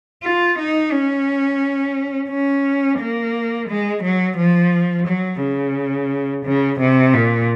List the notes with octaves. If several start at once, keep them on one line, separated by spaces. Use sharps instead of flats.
F4
D#4
C#4
C#4
A#3
G#3
F#3
F3
F#3
C#3
C#3
C3
A#2